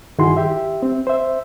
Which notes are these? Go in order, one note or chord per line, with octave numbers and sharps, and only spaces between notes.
G2 D#3 E4 F#4 G#4 C6
G4 E5
C4
C5 E5